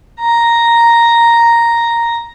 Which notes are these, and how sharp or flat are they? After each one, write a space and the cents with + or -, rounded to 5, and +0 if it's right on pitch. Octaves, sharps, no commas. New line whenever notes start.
A#5 +0